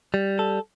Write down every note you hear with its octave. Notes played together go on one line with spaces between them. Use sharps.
G3
A4